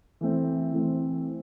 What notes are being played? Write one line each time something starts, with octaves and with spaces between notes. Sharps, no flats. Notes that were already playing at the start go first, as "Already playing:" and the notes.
E3 A3 C4
E3 A3 C4